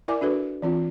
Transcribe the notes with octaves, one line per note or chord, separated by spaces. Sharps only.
E4 A#4 D5 E5 G#5 D6
D4 F#4 A4 B4
E3 C4 F4